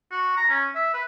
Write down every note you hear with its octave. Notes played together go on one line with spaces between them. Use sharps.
F#4
A#5
C#4
E5
B4